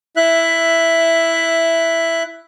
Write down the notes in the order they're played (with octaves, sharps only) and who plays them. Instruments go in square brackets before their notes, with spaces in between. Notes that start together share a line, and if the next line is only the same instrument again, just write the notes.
[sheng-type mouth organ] E4 E5 F#6